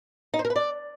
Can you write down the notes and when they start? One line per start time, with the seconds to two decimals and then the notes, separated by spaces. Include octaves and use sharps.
0.34 D#4
0.39 C5
0.45 A#4
0.50 B4
0.56 D5